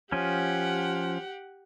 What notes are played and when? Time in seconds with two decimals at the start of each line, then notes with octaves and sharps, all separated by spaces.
0.12 F3 C#4 G4 F#5